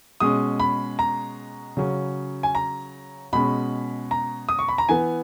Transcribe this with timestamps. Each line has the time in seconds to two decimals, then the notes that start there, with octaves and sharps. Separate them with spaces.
0.20 B2 G#3 C#4 D#6
0.60 B5
0.99 A#5
1.77 C#3 F#3 C#4
2.43 G#5
2.55 A#5
3.33 B2 G#3 C#4 B5
4.11 A#5
4.49 D#6
4.59 C#6
4.68 B5
4.78 A#5
4.89 E3 B3 G#5